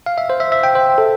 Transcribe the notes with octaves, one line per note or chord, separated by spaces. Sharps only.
F5
E5
C5
E5
E5
G5
C5
A4